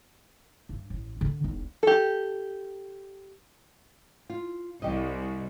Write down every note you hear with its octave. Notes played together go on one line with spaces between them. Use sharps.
G2
A1
D3 D4
E1 B1
G4 A4
F4
C2 G4 D#5